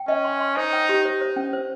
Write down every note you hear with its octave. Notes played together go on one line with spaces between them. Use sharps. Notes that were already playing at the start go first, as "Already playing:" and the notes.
Already playing: G5
C#4 D#5
C6
C6
D#4 C5
G5
G4
C5
C5
C#4
C5